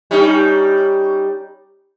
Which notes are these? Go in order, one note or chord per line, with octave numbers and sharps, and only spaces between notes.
G3 C#4 D#4